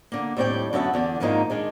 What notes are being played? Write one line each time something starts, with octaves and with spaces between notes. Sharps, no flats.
D3 A#3
D#2 A2 G3 C4 D5 G5
F#2 D3 B3 F#4 E5 A5
E2 D3 D4
F2 G#2 D#3 G#3 A#3 D#4
D#3 G#3 D4